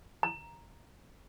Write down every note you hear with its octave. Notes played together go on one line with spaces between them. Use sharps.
A#5